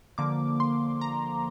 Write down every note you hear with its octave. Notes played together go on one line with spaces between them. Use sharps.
D3 F3 A#3 D6
C6
A#5